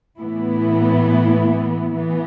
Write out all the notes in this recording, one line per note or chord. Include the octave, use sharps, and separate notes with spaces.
A2 E3 B3 E4
E3 B3